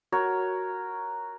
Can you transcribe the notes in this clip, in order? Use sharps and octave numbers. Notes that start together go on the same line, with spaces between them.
F#4 A#4 C#5